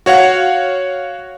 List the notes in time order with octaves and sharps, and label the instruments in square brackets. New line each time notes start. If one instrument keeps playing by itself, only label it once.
[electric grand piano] F#4 C#5 F5 F#5